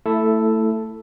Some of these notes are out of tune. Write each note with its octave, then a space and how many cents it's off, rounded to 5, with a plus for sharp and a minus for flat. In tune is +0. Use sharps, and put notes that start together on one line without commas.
A3 +20 E4 +0 A4 +0